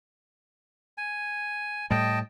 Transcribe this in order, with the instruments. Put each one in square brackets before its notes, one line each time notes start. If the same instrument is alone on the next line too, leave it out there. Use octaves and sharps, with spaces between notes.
[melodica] G#5
[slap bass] A2 G3 [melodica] D#5 G5 A5